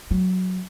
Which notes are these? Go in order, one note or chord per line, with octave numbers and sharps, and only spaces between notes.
F#3